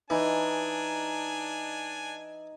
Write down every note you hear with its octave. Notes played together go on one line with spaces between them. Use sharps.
E3 D4 D#4 G#5